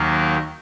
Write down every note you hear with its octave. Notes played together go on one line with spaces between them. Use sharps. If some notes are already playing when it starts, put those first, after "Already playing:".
Already playing: D#2 D#3 F#3 A#3